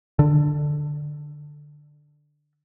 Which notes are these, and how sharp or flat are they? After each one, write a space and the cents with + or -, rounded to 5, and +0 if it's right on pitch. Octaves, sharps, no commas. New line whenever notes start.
D3 +10